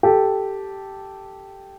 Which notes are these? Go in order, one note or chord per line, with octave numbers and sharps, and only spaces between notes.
G4 A4